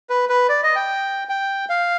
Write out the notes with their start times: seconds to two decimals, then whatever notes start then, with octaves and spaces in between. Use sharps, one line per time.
0.10 B4
0.29 B4
0.49 D5
0.63 D#5
0.76 G5
1.29 G5
1.69 F5